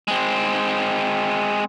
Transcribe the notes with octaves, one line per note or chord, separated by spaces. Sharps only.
G#3 C4